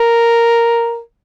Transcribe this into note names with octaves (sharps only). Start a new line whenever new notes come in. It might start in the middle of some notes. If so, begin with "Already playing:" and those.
Already playing: A#4